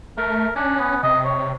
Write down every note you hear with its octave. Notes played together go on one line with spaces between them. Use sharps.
A3 A#4
C#4 D4
B3
C3 D#5
C#5